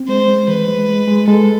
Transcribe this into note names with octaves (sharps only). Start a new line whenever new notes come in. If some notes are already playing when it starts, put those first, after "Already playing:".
Already playing: C4
G#3 C5
G#3
E3 B4
G#3
G#3
G#3
G#3 A4